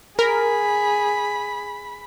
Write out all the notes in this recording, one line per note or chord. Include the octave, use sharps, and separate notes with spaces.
G#4 A#4 B5